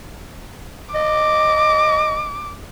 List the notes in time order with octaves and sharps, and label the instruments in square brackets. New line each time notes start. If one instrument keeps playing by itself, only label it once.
[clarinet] D#5 [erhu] D6